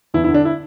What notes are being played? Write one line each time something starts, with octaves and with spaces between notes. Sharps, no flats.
E2 E4
E4
D3
D4
E4